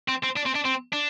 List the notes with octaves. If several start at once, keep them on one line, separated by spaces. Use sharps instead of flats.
C4
C4
D4
C4
D4
C4
D4